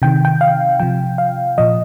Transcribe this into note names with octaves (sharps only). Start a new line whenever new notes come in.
C3 D#3 G5
G5
F5
C3 F3 G5
F5
A#2 F3 D#5